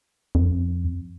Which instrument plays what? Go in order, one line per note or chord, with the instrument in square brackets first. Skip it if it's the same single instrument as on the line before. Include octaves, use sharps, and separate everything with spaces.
[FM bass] F2